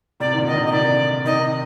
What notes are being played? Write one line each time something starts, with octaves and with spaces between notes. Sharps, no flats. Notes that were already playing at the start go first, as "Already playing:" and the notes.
A2 C3 D5
D#3
A#2 D3
D#5
C3 D#3
D#5
C3 D#3 D5
C3 D#3 D#5